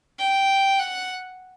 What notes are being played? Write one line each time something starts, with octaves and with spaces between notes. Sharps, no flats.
G5
F#5